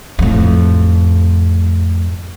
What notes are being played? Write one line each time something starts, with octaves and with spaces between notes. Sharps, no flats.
F2 A2